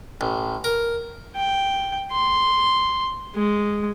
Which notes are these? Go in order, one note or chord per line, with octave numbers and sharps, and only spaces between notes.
A1
A#4
G5
C6
G#3